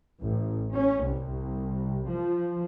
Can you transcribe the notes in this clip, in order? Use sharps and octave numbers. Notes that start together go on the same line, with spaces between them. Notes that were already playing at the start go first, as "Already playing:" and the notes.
A1
C#4
C2
F3